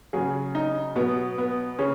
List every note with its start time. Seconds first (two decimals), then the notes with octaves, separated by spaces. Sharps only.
0.13 C#3 F#3 G#4
0.55 D#4
0.96 B2 F#3 B3
1.38 B3
1.79 C#3 C#4